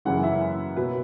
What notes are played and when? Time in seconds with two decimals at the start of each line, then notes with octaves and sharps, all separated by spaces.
0.05 F#2 C#3 E3 G#3 C#4 F#5
0.23 E5
0.76 B2 F#3 B3 B4